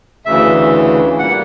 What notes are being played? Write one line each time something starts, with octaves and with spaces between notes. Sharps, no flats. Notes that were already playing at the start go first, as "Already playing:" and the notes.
D2 C#3 E3 E5
A#2 G3 A#3 F#5